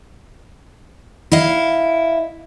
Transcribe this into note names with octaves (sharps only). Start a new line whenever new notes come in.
E4 D#5 F5